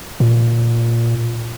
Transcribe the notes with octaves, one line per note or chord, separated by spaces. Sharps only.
A#2